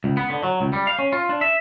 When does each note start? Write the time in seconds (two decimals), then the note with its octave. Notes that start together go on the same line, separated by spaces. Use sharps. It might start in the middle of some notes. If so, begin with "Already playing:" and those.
0.04 C#2
0.17 B3
0.30 D3
0.43 F#3
0.60 C#2
0.73 G3
0.87 F5
0.99 C#4
1.12 F4
1.29 D4
1.41 E5